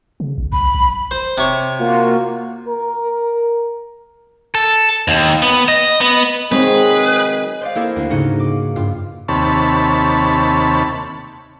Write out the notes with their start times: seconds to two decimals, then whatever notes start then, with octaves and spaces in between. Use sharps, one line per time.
0.20 C#3
0.38 A1
0.52 C2 B5
0.74 B1
1.11 C5
1.38 C3 C#5
1.78 A#3 F4 F#4
2.68 A#4
4.55 A4
5.08 D#2
5.42 B3
5.68 D#5
6.01 B3
6.52 D#3 F#3 G#3 C4 G#4 B4
7.61 C5 D5 F5
7.75 A#3 E4 G4 A4 G#6 C7
7.96 D2
8.10 G#2 C#3 C#4 D#4 F#4
8.40 D6
8.76 G2 F4
9.28 D#2 C3 C#5 A5 B5